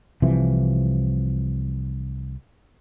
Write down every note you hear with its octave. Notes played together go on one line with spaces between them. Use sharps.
C2 C3 E3 F3